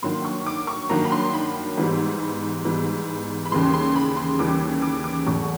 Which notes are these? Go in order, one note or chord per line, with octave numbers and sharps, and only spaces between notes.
G2 D#3 F#3 A#3 C6
C#6
D6
C#6
G2 D#3 F#3 A#3 A#5
B5
C6
B5
G#2 E3 G3 B3
G#2 E3 G3 B3
B5
D#2 C#3 E3 G3 C6
C6
B5
C6
D#2 C#3 E3 G3 D6
D6
D6
E2 B2 F#3 A3 C#6